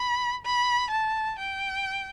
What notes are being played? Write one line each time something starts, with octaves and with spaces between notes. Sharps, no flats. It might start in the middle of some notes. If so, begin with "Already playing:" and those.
Already playing: B5
B5
A5
G5